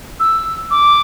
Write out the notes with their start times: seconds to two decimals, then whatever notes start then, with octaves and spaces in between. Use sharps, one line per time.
0.20 E6
0.71 D6